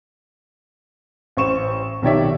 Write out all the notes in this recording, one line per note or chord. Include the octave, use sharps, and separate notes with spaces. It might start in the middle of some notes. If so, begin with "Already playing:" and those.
A1 C5 C#6 E7
B1 D#3 G4 C#5 D5 E5